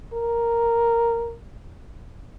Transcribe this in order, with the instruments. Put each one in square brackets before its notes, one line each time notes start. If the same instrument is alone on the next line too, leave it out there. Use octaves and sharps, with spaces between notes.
[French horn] A#4